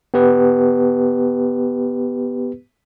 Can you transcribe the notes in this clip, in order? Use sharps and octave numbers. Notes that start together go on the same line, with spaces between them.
B3 G4 B4